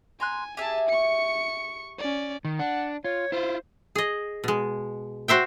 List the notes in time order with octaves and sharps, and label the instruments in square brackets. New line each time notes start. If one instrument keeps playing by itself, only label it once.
[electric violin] G#5 [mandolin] A#5 C6 F#6
[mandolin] G4 G#4 E5 [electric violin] G#5 A5
[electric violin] C#6 C#7
C#4 D5
[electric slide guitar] D#3
[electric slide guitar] D4 [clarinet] F#5
[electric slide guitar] F4 [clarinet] C#5
[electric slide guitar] E4 F4 [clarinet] C5
[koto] G#4 D#5
B2 G#3
F#4 C5 E5 G5